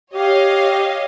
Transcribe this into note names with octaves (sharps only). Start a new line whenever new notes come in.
G4 C#5 D#5 F5